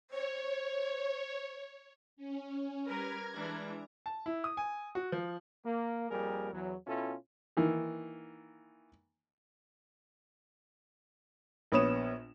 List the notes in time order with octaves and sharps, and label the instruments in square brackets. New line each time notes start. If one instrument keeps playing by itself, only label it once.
[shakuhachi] C5 [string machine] C#5
[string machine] C#4
[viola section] G3 A#4 B4 [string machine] A#5 F6 G#6
[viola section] E3 G#3 D4
[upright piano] A5
E4
D#6
G#5
F#4
F3
[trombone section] A#3
F2 G3 A#3 G#4 A#4
E2 F#3
B2 C#4 E4 F4 A4
[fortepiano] D#3 E3 A#3
[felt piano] A#1 B3 C#5 D#6 E7